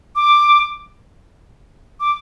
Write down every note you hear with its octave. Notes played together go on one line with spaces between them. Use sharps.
D6
D6